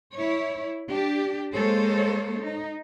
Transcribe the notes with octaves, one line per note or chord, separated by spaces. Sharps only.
E4 C#5
D4 G4
G#3 A#3 A4 C5 C#5
D#4